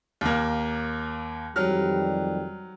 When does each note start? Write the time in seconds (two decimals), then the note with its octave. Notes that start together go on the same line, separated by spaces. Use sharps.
0.21 D#2 A#3
1.56 F2 D#3 F#3 G3 F6